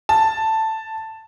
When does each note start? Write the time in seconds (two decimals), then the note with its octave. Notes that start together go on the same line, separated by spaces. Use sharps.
0.09 A5